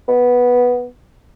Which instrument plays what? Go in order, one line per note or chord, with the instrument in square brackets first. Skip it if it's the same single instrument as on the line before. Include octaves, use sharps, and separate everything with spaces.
[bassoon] B3